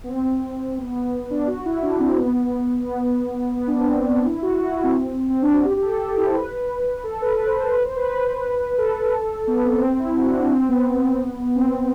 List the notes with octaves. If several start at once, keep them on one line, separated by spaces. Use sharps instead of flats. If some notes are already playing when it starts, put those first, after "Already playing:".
B3
C4
B3
B3
D4
F#4
E4
D4
C4
B3
B3
B3
D4
C4
C4
D4
E4
F#4
F#4
E4
C4
C4
D4
F#4
G4
G4
A4
A4
G4
E4
C5
B4
A4
B4
B4
C5
C5
B4
C5
B4
B4
A4
B3
C4
C4
E4
F#4
D4
F#4
C4
B3
B3
C4